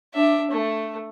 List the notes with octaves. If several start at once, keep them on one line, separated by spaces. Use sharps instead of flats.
D4 E5
A3